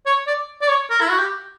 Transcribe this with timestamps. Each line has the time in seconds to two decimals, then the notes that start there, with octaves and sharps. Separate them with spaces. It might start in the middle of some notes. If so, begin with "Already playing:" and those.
0.06 C#5
0.27 D5
0.62 D5
0.69 C#5
0.90 A#4
1.01 E4
1.09 F#4
1.18 G4